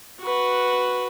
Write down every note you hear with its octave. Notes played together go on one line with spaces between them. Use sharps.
F#4 B4